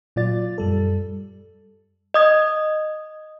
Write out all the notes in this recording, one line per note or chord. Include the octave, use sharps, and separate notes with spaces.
A#2 F#3 F4 D5 A6
F#2 G3 A4
D#5 D#6 G#6